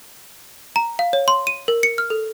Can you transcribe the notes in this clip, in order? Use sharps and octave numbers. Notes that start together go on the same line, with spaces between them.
A#5
F5
C#5
C6
D#7
A#4
C#7
F6
A4